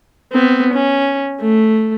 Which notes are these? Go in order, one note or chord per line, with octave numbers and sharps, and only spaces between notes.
B3 C4
C#4
A3